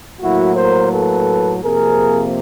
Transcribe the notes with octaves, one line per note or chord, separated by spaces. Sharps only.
A2 F#3 A#3 E4 F#4
A#4 C5
A4 B4
F2 C3 F3 A#3 G#4 A#4